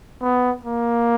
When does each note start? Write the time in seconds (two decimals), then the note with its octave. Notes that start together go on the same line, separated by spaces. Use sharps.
0.22 B3
0.65 A#3